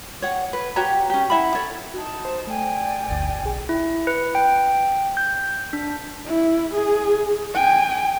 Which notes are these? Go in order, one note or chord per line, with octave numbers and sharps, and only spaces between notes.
C#5 F#5
B4
F#4 G4 C#5 A#5
C#4 G4
E4 E5 F#5 B5
A4 C#5
D#4 F#4 A5
C5
A3 D5 G5 G#5
G1 D2
B1 G#4
E4
B4
G5
G6
D4
E4
G#4
G5 G#5